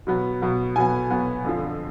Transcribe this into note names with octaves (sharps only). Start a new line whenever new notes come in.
B2 F#3 B3
B2 F#3 B3
B2 F#3 B3 G#5
B2 F#3 B3
F2 D3 F3